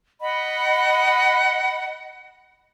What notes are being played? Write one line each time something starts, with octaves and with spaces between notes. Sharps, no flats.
D#5 F#5 B5